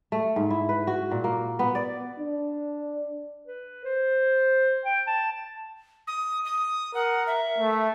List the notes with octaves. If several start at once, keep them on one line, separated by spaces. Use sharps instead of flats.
A3
G#2
E4
B4
F#4
A#2
A#3
B3
D5
D4
B4
C5
G5
A5
D#6
D#6
A#4 F#5
E5
A3